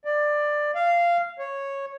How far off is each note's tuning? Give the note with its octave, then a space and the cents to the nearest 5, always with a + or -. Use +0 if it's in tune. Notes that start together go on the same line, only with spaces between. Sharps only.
D5 +15
F5 -15
C#5 -10